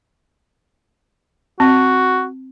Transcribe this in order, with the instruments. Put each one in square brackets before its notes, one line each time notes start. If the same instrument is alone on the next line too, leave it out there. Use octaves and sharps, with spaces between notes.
[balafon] C4 [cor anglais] F#4